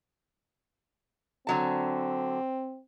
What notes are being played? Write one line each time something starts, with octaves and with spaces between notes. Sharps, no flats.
D3 F#3 C4 A5